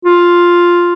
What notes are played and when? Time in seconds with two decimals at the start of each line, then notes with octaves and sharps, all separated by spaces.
0.05 F4